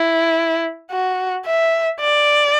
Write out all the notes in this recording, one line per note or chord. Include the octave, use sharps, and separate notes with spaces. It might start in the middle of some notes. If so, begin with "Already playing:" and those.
Already playing: E4
F#4
E5
D5